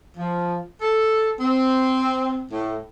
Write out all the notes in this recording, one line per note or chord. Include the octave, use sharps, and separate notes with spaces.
F3
A4
C4
A2